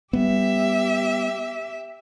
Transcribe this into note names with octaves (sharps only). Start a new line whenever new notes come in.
G3 B3 G4 E5